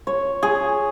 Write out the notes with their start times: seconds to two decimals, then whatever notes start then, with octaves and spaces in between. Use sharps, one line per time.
0.07 C#5
0.43 G#4